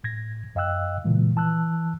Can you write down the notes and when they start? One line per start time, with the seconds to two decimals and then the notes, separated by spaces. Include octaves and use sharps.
0.04 A2 G#6 A#6
0.55 F#2 D#5 F5 G5 E6 F#6
1.04 A#2 C#3 E3 G#3
1.36 E3 A5 E6 F#6